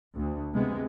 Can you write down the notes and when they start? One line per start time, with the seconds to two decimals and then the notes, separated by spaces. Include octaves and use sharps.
0.15 D2
0.53 C3 G#3 B3